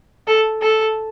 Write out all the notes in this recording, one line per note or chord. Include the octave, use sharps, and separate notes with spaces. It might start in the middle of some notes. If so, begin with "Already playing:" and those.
A4
A4